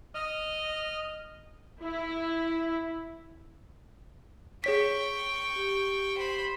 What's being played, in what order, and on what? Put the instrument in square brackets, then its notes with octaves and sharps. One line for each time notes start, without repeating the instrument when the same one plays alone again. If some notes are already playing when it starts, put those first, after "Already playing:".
[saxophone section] D#5 [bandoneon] F6
[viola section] E4
[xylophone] G#4 C#5 B6 [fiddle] G5 C#6
[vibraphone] G4
[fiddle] C5 B5